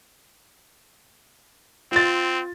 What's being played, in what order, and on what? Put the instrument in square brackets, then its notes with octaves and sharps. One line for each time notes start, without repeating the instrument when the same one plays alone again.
[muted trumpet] C4 [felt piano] F4 A6